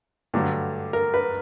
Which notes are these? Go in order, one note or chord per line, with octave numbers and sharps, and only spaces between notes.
G2 D3 F#3 A3
A#4
B4